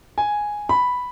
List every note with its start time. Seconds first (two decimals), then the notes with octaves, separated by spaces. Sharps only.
0.18 G#5
0.69 B5